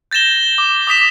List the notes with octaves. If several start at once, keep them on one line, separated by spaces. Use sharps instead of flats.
G6 A6 A#6 E7 G7
D6
D6 D#6 B6 E7